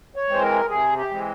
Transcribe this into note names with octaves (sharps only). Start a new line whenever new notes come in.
C#5
E3 G#3 C4 C5
A#4
C3 G#4
G4
E3 G#3 C4